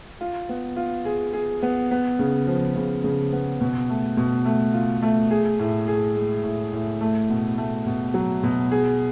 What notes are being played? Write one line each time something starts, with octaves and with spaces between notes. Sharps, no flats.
F4
B3
F4
G#4
G#4
B3
B3
C#3
F3
C#3
C#3
B3
B2
A3
B2
A3
F4
A3
G#4
A2
G#4
G#3
A2
A2
A3
B2
A3
B2
F#3
B2
G#4